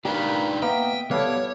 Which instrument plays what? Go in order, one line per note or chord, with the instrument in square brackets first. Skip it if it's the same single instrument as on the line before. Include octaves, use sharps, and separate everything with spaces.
[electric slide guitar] D4 D#4 B4 [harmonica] F4 A#4 B5 [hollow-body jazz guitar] G4
[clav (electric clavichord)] A#3 B3 A#4 [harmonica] D#5 E5 [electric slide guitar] G5
[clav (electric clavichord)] G3 A4 F5 [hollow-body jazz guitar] B3 [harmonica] E4 D6 [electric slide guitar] C#5